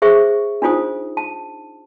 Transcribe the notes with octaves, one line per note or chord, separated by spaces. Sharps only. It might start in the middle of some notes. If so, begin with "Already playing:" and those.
G#4 C5 E5 C#6
D4 D#4 F4 C5 D#6
A5